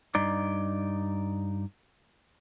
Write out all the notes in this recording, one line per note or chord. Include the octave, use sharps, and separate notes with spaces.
G2 D#4 D5